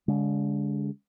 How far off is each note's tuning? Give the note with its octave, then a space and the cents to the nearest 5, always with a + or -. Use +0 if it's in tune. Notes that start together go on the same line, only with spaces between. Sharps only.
D3 -45 G#3 -20